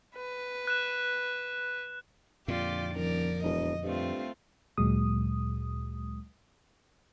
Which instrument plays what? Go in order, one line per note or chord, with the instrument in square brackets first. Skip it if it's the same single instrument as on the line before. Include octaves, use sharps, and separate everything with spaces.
[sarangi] B4
[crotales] F#6 E7
[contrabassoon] A#1 [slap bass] F2 A#2 D3 [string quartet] F4 G4 D5
[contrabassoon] D#1 [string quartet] F3 A#4 D5
[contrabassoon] E1 [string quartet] D#5
[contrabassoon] G2 [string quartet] A3 C4 F4
[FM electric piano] D2 A#2 F#3 G#3 D#6